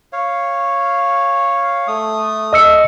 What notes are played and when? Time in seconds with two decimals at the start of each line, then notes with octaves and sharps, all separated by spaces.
0.13 C#5 F5
1.88 A3 D#6
2.53 D#5 E6 C#7